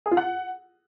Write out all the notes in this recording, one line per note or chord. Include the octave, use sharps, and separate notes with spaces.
G#4
F4
F#5